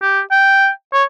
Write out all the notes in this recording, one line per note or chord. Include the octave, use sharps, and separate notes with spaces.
G4
G5
C#5